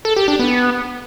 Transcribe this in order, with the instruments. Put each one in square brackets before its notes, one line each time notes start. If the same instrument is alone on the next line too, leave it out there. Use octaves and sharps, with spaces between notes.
[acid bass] A4
G4
D4
B3